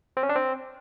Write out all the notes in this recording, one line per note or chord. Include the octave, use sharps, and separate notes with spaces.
C4
C#4
D4
C4